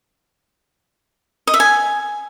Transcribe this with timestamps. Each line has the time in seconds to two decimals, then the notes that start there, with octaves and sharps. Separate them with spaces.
1.47 D#5
1.54 E5
1.60 G#5